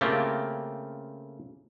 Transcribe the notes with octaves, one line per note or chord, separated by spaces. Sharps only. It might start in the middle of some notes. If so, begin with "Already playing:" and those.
C#3 A3 A#3 C4 F4 G4